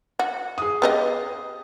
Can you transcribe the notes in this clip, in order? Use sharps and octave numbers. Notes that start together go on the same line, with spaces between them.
F#4
G#4 D#6
B3 G4 D#5